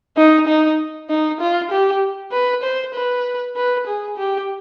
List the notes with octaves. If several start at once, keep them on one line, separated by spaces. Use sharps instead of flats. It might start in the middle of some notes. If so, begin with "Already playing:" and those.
D#4
D#4
D#4
F4
G4
B4
C5
B4
B4
G#4
G4